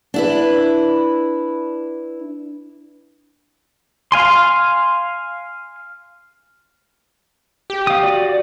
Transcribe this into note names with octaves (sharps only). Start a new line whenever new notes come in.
D4 E4 B4
F5 G#5 C6
G4
F5 D#6
F#4 D5